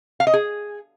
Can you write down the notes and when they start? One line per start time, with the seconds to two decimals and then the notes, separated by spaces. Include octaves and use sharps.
0.20 F5
0.27 D#5
0.34 G#4